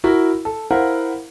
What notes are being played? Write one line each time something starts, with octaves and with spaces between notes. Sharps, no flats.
E4 F#4 A#4
A4
E4 A#4 C5 F5 F#5